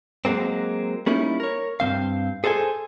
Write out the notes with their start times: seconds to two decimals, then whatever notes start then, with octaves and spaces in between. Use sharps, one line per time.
0.25 F#3 G#3 A#3 C4
1.06 G3 A#3 C#4 D#4 E4
1.40 A#4 C#5
1.80 G2 E3 C4 F5
2.44 G#4 A4 C5 D5 G#5